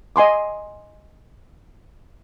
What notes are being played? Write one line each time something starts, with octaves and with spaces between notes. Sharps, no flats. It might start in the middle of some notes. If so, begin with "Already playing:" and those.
D#5 G#5 C6 D6